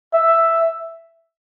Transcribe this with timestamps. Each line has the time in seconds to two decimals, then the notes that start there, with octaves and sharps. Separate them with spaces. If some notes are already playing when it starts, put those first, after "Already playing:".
0.14 E5